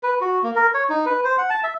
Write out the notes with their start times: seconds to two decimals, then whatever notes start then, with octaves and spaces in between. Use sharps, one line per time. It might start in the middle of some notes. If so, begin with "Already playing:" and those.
0.03 B4
0.21 F#4
0.43 A#3
0.56 A#4
0.74 C#5
0.90 D#4
1.06 B4
1.24 C5
1.38 F#5
1.50 A5
1.64 E5